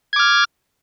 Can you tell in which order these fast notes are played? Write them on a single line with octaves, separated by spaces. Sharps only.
G#6 D6 F6